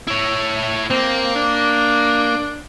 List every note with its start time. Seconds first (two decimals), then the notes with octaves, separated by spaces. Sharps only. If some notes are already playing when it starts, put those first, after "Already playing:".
0.08 E4 C#5
0.90 A#3 C4
1.35 D4